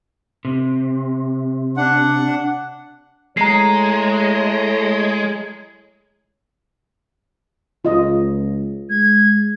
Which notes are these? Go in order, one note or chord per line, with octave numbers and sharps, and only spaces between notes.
C3
D4 F#5
G#3 A3 E4 C#5 A#5 C7
C#2 F4 D#5
G#3 G#6